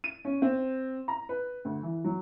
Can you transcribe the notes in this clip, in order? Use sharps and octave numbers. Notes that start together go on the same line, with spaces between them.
D#7
C#4
C4
A#5
B4
D2
E3
F#3